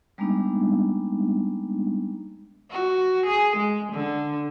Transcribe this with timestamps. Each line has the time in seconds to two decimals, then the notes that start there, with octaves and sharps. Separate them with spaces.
0.18 G3 G#3 A#3 B3 D4 D#4
2.71 F#4
3.26 G#4
3.56 G#3
3.92 D3